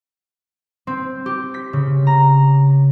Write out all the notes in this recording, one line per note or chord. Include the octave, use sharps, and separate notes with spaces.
C4
G4
B6
C#3
A#5